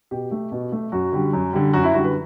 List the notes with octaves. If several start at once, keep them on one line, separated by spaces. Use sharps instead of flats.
B2 G4
A3
B2
A3
F#2 F#4
D3 G3
F#2
D3 G3
F#2 F#4
E4
D3 G3 F#4
B4